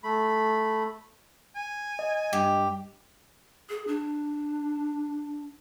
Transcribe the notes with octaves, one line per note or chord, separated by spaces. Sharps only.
A3 B5
G#5
D#5
G2 G4
G#4
D4